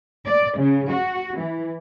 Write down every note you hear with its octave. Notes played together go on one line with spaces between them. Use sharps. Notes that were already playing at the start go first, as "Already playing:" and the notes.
D5
C#3
F#4
E3